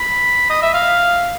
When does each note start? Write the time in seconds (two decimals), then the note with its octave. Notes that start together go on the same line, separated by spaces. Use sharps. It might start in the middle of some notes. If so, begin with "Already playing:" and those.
Already playing: B5
0.50 D#5
0.62 E5
0.74 F5